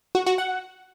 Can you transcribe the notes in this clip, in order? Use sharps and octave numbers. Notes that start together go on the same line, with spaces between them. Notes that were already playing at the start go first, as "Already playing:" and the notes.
F#4
F#4
F#5